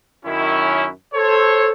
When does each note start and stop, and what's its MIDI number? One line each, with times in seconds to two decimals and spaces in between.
0.25 0.88 42
0.25 0.88 51
0.25 0.88 61
0.25 0.88 64
1.14 1.72 69
1.14 1.72 72
1.14 1.72 73